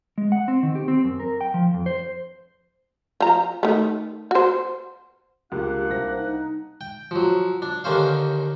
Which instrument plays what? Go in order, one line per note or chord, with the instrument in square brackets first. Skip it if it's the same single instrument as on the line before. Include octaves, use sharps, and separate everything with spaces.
[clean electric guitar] G#3
F#5
C4
D#3
G4
C4
F#2
A#4
G5
F3
F2
C5
[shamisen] F3 A#5
D#3 A3
F#4 C5
[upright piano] C#2 [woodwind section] A#3 D4 F#5 [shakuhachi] G4
[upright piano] C2 A#6 [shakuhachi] C5
[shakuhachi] D#4
[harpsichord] G5
F3 F#3
D4
D#2 D3 A#3 C#4 C5 F5